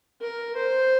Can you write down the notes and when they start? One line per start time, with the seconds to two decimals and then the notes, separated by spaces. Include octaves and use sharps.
0.22 A#4
0.56 C5